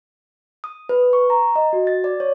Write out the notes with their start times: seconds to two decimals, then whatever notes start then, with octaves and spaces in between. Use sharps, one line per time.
0.64 D#6
0.89 B4
1.13 C#6
1.30 A#5
1.56 D#5
1.73 F#4
1.87 A6
2.04 D5
2.20 C#5